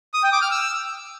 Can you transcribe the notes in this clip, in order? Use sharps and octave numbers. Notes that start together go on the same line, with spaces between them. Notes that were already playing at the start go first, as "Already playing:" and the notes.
D#6
G5
D6
F6
E6